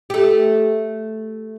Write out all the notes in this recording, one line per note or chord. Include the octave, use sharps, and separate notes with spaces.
A3 G4